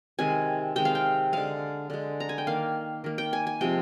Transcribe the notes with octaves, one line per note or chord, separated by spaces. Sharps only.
C3 D#3 G#3 G#5
C3 D#3 G#3 G5
F5
G5
D3 G#3 F5
D3 G#3
A#5
G#5
G5
D#3 A#3 F5
D#3 A#3
G5
G#5
G#5
C3 F3 G#3 G5